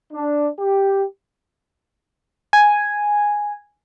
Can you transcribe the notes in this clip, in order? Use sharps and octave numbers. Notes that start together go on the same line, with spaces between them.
D4
G4
G#5